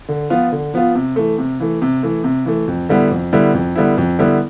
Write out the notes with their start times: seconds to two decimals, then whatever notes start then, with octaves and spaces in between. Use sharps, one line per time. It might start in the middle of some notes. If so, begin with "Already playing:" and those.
0.09 D3
0.30 F3 B3 F4
0.52 D3
0.74 F3 B3 F4
0.95 C3
1.16 E3 A3
1.38 C3
1.60 E3 A3
1.82 C3
2.03 E3 A3
2.24 C3
2.46 E3 A3
2.68 F2
2.89 D3 G3 B3 E4
3.11 F2
3.33 D3 G3 B3 E4
3.54 F2
3.75 D3 G3 B3 E4
3.98 F2
4.19 D3 G3 B3 E4